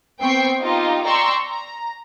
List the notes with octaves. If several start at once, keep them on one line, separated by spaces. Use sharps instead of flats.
B3 C4 G5 C#6 C7
D#4 F4 G4 D#5
D5 G5 A#5 C6 C#6 E6
A#5